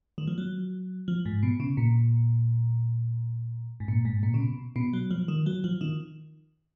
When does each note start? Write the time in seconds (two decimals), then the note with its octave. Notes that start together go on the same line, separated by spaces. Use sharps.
0.18 D#3
0.27 F3
0.38 F#3
1.08 F3
1.26 G#2
1.43 B2
1.60 C#3
1.77 A#2
3.80 G#2
3.88 A#2
4.05 G#2
4.23 A#2
4.34 C#3
4.40 B2
4.76 B2
4.93 F#3
5.11 F3
5.28 D#3
5.46 F#3
5.64 F3
5.81 D#3